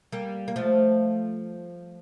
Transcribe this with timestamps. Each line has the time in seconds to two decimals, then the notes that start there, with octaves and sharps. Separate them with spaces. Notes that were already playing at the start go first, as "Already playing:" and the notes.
0.12 G3 A#3
0.48 A#3
0.56 F3 A3